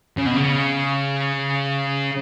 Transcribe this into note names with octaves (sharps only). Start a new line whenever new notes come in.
C#3
B2
C#3